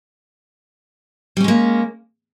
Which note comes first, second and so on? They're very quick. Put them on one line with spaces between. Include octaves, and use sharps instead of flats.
G3 C#4 G#3 A#3